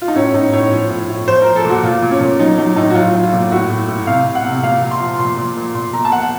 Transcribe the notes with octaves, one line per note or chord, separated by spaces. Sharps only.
F4
D#4
A2 C#4
A2 D#4
A2 C#5
F3
A2
A2
F3 C5
A#4
F3
A4
A#2 F#4
A#2 F4
A#2
C#4
A#2
F#3 D#4
F#3 D#4
A2 D#4
F#4
F#3 F4
F#3
F4
A#2
A2 F#4
A2
A2
C3 F5
C3
F#5
C3
A#2 F5
A#2
C6
F3
A#2 C6
A#2
A#2
A#2 C6
A#2 A#5
A5
F3 F#5